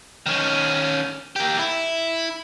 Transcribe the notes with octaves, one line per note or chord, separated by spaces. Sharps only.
D#3 C#4
A#3 G4
E4